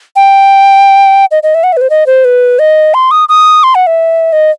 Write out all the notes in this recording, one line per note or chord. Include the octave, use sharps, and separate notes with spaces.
G5
D#5
D#5
E5
F#5
E5
B4
C5
D#5
C5
B4
D#5
C6
D#6
D#6
C6
F#5
E5
D#5